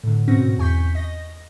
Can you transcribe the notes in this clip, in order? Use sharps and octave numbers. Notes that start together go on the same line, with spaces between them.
A2 D3
G#2 B2 C4 C#4 F#4 A#6
E2 G#5 C#6 G6 B6
D#5 A#6